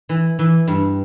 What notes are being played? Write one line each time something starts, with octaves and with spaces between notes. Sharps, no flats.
E3
E3
G2